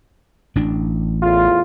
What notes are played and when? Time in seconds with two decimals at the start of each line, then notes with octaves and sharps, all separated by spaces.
0.56 A1 D4
1.23 E2 A2 F4